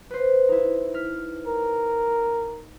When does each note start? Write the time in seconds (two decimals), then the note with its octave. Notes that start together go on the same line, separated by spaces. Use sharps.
0.11 B4 C5
0.49 D#4 E4
0.94 F6 B6
1.47 A#4